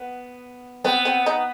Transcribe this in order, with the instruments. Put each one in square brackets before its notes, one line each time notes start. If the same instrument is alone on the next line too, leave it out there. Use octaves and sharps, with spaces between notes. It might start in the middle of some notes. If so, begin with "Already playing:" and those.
Already playing: [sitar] B3
[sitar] B3 [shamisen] C4
[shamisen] C4
D#4